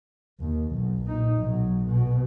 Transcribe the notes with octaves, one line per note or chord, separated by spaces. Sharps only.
D#2
B1
A#2 D#4
B1 F#3
B2